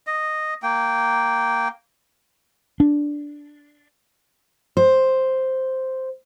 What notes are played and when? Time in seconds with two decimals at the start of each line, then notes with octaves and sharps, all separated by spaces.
0.07 D#5
0.63 A#3 G5
2.80 D4
4.77 C5